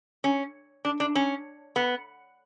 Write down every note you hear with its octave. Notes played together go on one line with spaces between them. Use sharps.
C#4
D4
D4
C#4
B3